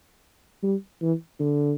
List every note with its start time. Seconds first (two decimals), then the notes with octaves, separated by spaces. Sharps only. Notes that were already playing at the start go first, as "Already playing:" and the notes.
0.63 G3
1.02 E3
1.40 D3